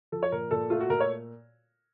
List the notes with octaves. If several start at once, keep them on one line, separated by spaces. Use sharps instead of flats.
F3 A4
C#5
A#2 A#4
A#2 A4
A3 F4
F#4
A#2 A#4
C#5